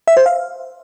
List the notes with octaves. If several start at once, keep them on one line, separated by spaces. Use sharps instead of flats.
E5
C5
F5